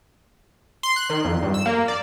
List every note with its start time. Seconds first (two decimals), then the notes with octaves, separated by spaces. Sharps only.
0.83 C6
0.96 F#6
1.10 D#3
1.24 F2
1.42 G2
1.54 E6
1.66 A#3
1.88 D5